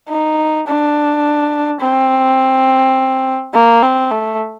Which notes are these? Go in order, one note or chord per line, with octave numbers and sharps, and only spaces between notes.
D#4
D4
C4
A#3
C4
A3